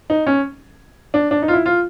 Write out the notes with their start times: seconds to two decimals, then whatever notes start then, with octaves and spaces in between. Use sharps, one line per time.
0.10 D#4
0.27 C#4
1.14 D4
1.31 D4
1.42 D#4
1.48 F4
1.53 E4
1.66 F4